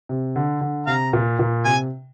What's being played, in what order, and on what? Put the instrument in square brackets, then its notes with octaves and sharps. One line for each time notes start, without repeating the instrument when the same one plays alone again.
[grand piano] C3
D3
D3
[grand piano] C3 [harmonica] F5 A#5
[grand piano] A#2
A#2
[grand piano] C3 [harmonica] G#5